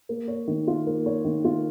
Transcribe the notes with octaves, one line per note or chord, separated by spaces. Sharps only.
A#3
C#5
D#3
F4
A#3
C#5
D#3
F4